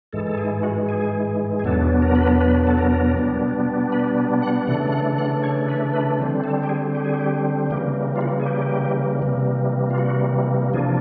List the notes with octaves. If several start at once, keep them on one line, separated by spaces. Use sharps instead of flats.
G#2 E3 G#3 A4
A4
G#4
F#4
G#4
G#4
E2 B2 F#3 B3 D4 A4
A#4
B4
A#4
B4
A4
A#4
B2 G3 B3 D4
B4
F#5
C#3 E3 A3 D4 F#5
F#5
F#5
C#5
B4
B4
D3 G3 C4
A4
G4
G#4
G4
G#4
G4
C#3 E3 G3 A#3 G4
F4
F#4
G#4
G4
C3 E3 G3 A#3
F4
F#4
C3 F3 A#3 D4 G#4